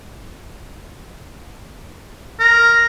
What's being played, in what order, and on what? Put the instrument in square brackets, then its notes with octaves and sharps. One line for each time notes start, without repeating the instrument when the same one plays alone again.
[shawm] A#4